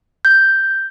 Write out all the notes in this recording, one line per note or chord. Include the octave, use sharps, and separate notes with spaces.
G6